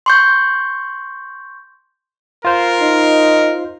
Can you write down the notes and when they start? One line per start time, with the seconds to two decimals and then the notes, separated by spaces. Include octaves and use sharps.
0.06 C6 C#6 G6
2.45 F4 A#4 C5
2.81 D#4